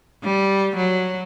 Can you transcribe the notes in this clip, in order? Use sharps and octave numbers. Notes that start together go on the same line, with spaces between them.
G3
F#3